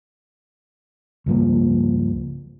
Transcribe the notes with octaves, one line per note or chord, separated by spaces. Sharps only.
C#2 G2 F3 A#3